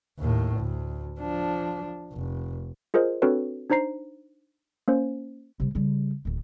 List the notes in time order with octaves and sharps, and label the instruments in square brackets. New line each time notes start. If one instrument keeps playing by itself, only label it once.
[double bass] D#2 A2
D2
F3 D4
F1
[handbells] F4 G#4 A#4 C5 D#5
C4 D4 F#4 A4 B4 C#5
D4 D#4 C5 A#5 C7
A#3 C#4 C5
[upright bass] C3 G3
C#3 G3
D1 D#3